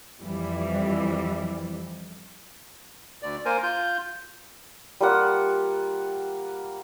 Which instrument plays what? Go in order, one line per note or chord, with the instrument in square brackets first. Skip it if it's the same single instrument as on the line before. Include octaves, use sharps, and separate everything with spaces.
[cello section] F2 E3 G3
[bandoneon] D2 D5
A#3 A#4 C5 G#5
F4 G6
[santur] G3 A#3 F4 F#5